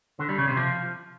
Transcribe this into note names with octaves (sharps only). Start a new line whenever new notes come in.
D3
G3
C#3
C3
F3